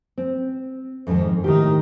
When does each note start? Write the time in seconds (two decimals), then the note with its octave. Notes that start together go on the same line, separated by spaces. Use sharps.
0.18 C4
1.07 F2 G#2 D#3
1.44 A2 D#3 D#4 G4